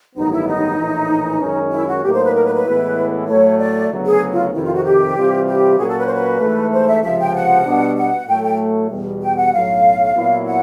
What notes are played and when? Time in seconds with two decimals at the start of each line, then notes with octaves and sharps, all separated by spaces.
0.16 A1 G2 D#3 F#3 B3 D#4
0.32 E4
0.46 D#4
0.78 A#1 A2 E3
1.40 F#2 D#3 G#3 C#4
1.71 E4
1.87 F#4
2.03 A2 F#3 A#3 D#4 G4
2.13 C5
2.24 B4
2.34 A#4
2.44 B4
2.55 B4
2.65 A2 E3 G#3 B3 E4
3.28 A2 F#3 A3 C#5
3.59 D5
3.91 D2 C#3 F#3 B3
4.06 G#4
4.32 F4
4.53 F2 C3 D#3 E4
4.64 F4
4.74 F#4
4.84 G4
5.15 C3 E3 G3 C4 F4
5.47 G4
5.78 A#2 F#3 A#3 C#4 F#4 G#4
5.88 A4
5.98 B4
6.06 C5
6.13 B4
6.40 G#2 E3 A3
6.72 C5
6.87 E5
7.02 C#2 C3 F3 E5
7.19 G5
7.34 F#5
7.65 B2 G3 B3 D4
7.97 F#5
8.27 A2 F#3 A3 G5
8.43 G5
8.90 E2 B2 G3
9.22 G5
9.37 F#5
9.53 B1 A2 F#3 F5
10.15 A#2 F#3 B3 E4
10.46 F#5